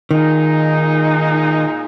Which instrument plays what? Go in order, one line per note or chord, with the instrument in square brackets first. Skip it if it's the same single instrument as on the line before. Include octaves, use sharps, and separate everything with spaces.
[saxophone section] A#2 G#3 D#4 [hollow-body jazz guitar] D#3